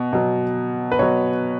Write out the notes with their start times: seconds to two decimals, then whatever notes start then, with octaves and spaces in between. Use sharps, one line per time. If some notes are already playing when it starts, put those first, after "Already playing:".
Already playing: B2
0.13 B2 F#3
0.92 B4
0.99 B2 F#3 C#5